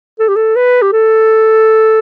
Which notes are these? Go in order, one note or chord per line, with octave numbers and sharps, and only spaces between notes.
A4
G4
A4
B4
G4
A4